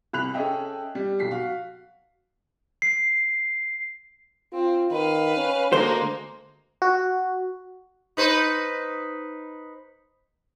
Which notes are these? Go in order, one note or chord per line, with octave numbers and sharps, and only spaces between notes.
C2 B5 F#6 F7
C#4 G#4 A4 D#5 E5 G5
G3
B1 B6 C7
F#4 F5
C7
C4 F4
D#3 B4 F5
C#4
D2 G#3 A#3 A4 C5
F#4
D#4 B4 C5